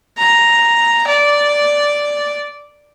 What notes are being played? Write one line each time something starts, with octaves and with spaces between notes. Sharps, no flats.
A#5
D5